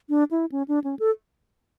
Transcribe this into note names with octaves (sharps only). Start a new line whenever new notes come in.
D4
E4
C#4
D4
C#4
A4